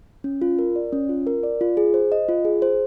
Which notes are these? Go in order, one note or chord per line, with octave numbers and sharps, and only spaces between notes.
C#4
F4
A#4
D5
C#4
F4
A#4
D5
F4
G#4
C5
D#5
F4
G#4
C5